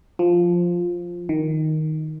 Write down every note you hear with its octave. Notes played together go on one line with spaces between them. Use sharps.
F3
D#3